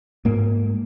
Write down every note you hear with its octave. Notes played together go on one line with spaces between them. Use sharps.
G#2 A#3